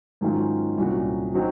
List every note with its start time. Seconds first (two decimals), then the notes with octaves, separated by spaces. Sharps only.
0.21 G#2 D#3 F#3 C#4 F4
0.77 C2 A#2 F#3 C#4 F#4
1.34 F#3 C4 D#4 F#4